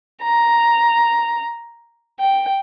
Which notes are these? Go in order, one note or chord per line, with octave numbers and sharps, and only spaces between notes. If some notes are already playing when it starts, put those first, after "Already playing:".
A#5
G5